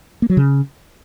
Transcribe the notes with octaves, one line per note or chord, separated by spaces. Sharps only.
A#3
F#3
C#3